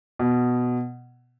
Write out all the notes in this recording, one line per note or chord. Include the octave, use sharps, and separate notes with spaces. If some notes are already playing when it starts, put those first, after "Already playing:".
B2